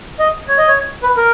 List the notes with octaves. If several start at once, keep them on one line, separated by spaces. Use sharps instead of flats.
D#5
C#5
D#5
C#5
B4
A#4